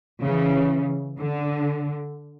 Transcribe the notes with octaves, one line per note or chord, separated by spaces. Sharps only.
C#3 E3
D3